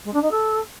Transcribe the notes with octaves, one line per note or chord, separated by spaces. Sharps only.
G#3
D4
D#4
A4